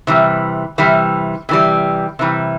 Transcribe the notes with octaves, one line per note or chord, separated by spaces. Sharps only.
C3 E3 G3
C3 E3 G3
C3 E3 G3
C3 E3 G3